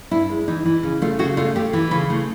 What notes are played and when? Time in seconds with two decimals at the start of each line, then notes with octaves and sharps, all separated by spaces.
0.11 G2 E4
0.29 G#3
0.48 E3 D#4
0.66 E3
0.83 C#3
1.02 A3 F4
1.19 C#3 F#4
1.37 A3 F4
1.56 A3 G4
1.73 E3
1.91 C#3 B4
2.10 A3 C5